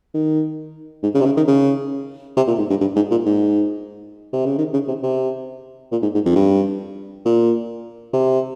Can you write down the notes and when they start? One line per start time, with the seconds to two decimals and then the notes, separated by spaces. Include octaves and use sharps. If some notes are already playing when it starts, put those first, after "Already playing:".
0.14 D#3
1.03 G#2
1.14 C#3
1.21 C3
1.26 C#3
1.37 D#3
1.48 C#3
2.37 C3
2.48 A#2
2.58 G#2
2.70 G2
2.81 G2
2.96 G#2
3.11 A#2
3.26 G#2
4.33 C3
4.46 C#3
4.58 D#3
4.73 C#3
4.88 C3
5.03 C3
5.92 A#2
6.02 G#2
6.14 G#2
6.26 F2
6.36 G2
7.25 A#2
8.13 C3